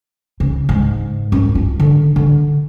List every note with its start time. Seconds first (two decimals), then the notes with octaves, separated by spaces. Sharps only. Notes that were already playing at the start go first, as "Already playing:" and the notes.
0.40 C#3
0.69 G#2
1.32 F#2
1.55 F4
1.80 D3
2.16 D3